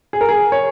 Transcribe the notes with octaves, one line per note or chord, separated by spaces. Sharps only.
G#4
A#4
G#4
C#5